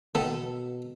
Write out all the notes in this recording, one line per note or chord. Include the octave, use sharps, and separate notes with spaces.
B2 D#3 B3 A4